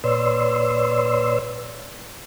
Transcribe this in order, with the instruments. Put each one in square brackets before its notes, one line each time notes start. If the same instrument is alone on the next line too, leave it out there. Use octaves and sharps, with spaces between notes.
[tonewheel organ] A#2 B4 C#5 D5 C6 E6